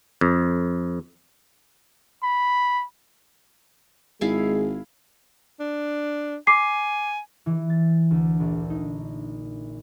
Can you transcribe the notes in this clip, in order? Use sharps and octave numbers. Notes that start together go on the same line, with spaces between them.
F2
B5
G#1 G#3 E4 G#4 F5
D4
G#5 D6 C7
E3
A6
D2
A#1
D#4